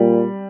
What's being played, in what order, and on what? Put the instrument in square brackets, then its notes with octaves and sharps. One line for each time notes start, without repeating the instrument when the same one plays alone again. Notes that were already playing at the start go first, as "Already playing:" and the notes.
Already playing: [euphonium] A#2 [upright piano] G3